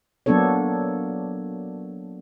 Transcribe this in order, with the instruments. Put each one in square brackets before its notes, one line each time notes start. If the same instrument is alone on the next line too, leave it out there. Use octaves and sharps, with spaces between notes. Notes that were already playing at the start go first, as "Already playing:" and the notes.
[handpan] F#3 A#3 B3 D4 A4 C#5